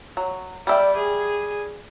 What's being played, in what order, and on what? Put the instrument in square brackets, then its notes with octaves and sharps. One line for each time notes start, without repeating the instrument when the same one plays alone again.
[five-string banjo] F#3
[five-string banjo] G3 E5 G5 [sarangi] D5
[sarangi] G#4